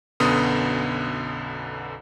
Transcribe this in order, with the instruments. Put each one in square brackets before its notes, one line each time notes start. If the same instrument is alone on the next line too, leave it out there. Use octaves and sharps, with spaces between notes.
[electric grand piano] B1 F#2 D3 B3 D#6